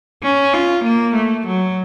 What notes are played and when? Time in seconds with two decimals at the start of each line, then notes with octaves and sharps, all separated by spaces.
0.23 C#4
0.54 F4
0.84 A#3
1.15 A3
1.47 F#3